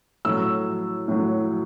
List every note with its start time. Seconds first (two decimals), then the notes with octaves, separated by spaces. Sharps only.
0.25 A2 F#3 E6
1.08 A2 F#3